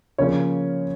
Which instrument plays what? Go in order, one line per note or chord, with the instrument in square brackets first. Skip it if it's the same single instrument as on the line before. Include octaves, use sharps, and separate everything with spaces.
[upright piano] C#3 F3 A#3 C#4 C#5